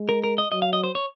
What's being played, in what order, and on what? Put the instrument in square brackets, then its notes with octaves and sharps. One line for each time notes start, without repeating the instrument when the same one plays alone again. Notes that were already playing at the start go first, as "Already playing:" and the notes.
Already playing: [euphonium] G#3
[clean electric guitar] A#4
A#4
D#5
[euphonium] F#3 [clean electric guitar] D#5
[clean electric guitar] F5
D#5
C5
C#5